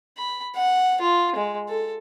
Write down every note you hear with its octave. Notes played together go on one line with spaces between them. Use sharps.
B5
F#5
F4
G#3
A4